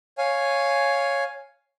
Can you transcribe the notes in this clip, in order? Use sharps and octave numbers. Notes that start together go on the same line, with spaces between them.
C#5 F5 G#5